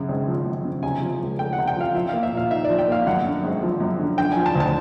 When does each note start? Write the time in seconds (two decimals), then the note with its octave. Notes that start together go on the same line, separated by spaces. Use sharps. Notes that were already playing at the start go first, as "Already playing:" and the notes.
Already playing: F#2 C#3
0.08 G#1
0.28 F3
0.46 F#2
0.65 C#3
0.83 C3 G#5
1.02 F3
1.21 C#2
1.39 A3 G5
1.53 F#5
1.58 C3
1.68 G5
1.76 F3 F5
1.94 F3 E5
2.09 A#3 F5
2.23 E5
2.33 A#2 F5
2.51 D#4 E5
2.65 D5
2.70 F3
2.78 G5
2.88 A#3 F5
3.07 F#2 F#5
3.25 D3
3.43 G#1
3.63 F3
3.80 F#2
3.99 D3
4.18 D3 G5
4.32 G#5
4.37 F3
4.46 A5
4.55 D2
4.60 A5